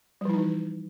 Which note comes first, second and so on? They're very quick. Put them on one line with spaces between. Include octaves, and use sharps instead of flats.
G3 F3 E4 D#4 E3